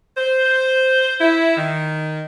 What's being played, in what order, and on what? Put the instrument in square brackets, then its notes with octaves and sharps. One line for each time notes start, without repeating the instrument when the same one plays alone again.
[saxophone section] C5
E4
D#3